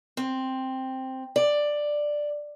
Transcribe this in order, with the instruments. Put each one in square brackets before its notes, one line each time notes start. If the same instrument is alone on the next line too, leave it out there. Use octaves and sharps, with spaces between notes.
[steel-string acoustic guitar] C4
D5